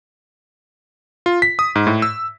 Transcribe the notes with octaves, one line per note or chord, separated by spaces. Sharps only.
F4
B6
D#6
G#2
A2
E6